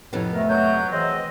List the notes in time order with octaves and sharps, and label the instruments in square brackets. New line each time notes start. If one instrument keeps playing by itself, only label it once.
[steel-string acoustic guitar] F2 C3 B3 [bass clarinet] A2 [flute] C#5
[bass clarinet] A3 [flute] A#4
[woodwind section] F#3 [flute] G6
[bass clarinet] E3 [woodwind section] F#3 G#3 C4 [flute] D#5